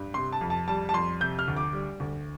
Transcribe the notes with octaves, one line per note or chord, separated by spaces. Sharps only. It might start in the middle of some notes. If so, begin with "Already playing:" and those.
Already playing: G2
C3 C6
A5
F2
A5
G3 A5
A5
F2 C6
C3 G6
F6
D2
D6
G3
D2